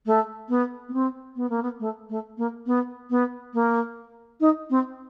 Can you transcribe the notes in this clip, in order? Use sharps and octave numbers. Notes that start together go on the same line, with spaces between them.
A3
B3
B3
C4
B3
A#3
B3
A3
A3
A#3
B3
B3
A#3
D#4
C4